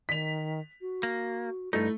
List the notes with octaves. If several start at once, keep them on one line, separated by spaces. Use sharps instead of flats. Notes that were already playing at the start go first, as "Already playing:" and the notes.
D#3 B6 F7
F#4
A#3
G2 A3 D#4 E4